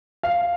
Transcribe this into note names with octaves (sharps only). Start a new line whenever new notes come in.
F5